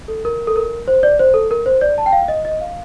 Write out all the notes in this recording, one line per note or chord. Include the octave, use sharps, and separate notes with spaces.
A4
A#4
A4
A#4
C5
D5
C5
A4
A#4
C5
D5
A5
G5
F5
D#5
D#5
F5